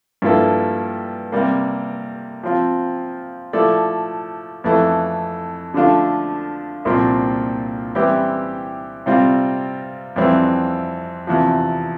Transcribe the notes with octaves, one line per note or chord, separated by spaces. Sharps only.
G2 F3 A#3 E4 A4
C3 G3 A#3
F3 C4 F4
F3 A3 E4 A4 D5
F2 E3 A3 E4 A4
D3 F3 A3 D4 F4
C2 A#2 F3 C4
E3 G3 C4 E4 G4
C3 G3 C4 F4
F2 E3 G3 C4 E4
E2 C3 F3